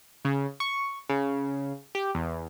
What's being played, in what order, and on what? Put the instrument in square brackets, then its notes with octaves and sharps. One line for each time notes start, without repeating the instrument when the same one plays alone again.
[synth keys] C#3
C#6
C#3
G4
E2